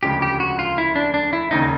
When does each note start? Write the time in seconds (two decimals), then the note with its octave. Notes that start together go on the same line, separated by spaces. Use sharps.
0.03 E1 D2 C#3 F3 G#3 G4
0.22 G4
0.40 F#4
0.59 F4
0.78 E4
0.95 D4
1.14 D4
1.33 E4
1.51 E1 D#2 C#3 D#4